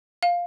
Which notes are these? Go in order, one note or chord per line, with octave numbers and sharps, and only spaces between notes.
F5